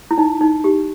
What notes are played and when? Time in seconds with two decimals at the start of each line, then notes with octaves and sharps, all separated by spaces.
0.11 E4
0.18 D#4
0.41 D#4
0.64 G4